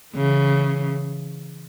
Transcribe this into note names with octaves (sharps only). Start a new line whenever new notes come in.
C#3 E3